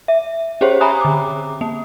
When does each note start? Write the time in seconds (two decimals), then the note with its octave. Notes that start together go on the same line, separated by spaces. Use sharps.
0.08 E5
0.61 C#4 G4 G#4 C5 C#5
0.81 E5 G#5 A#5 B5 D#6 F#6
1.01 D3 D6
1.61 A#3